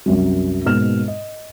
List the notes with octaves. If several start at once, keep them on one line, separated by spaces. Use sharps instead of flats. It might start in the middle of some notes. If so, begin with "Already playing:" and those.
C2 F#2 F#3
G#2 B2 A#3 F6 E7
D#5